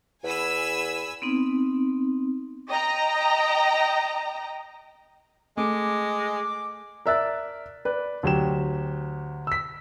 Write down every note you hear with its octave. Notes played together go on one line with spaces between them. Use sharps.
E2 G#5 B5 E6
B3 C4 D#4
D#5 G5 A#5
G#3 A3 D6
A#4 D5 E5 E6 F#6 A6
B4 D5
D2 F#3 G4 E7
E6 B6